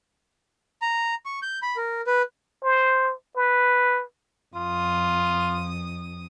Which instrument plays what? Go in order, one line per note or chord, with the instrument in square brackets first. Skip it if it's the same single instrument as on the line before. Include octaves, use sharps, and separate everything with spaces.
[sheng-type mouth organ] A#5
C#6
G6
B5
A#4
B4
[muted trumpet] C5
B4
[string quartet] F2 D#6 [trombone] F4